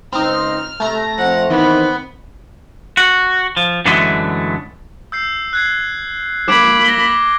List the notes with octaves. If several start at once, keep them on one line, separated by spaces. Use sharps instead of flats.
C#2 C4 D#4 F6
C3 A3 A#5
F2 C4 F#5
D#3 E3 B3
F#4
F3
F#2 D3 E3 F#3 G#3 A3
E6 G6 C7
F#6 G#6 C7
A#3 B5 D6 G#6 D7
A#6 G7